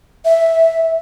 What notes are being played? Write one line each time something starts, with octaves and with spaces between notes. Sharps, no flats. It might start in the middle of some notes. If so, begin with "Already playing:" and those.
E5